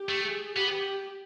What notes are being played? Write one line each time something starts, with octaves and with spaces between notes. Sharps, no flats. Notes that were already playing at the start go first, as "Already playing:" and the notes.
Already playing: G4
A3
G#4
B3 G4